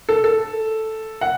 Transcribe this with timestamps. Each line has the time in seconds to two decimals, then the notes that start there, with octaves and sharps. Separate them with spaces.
0.09 A4
0.24 A4
1.21 F#5